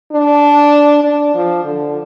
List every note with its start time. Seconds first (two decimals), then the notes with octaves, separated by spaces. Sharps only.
0.12 D4
1.04 D4
1.35 F3
1.64 D3